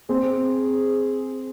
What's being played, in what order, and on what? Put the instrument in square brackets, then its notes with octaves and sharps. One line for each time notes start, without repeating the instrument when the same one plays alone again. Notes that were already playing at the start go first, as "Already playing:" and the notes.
[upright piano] C4 [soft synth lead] G#4